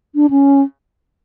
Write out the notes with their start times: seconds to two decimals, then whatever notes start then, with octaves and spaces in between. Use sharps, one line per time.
0.15 D4
0.30 C#4